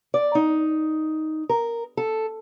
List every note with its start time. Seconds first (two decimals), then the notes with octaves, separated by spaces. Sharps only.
0.14 D5
0.35 D#4
1.49 A#4
1.97 A4